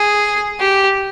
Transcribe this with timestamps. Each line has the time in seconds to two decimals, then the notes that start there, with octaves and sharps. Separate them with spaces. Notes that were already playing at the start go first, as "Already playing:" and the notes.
Already playing: G#4
0.59 G4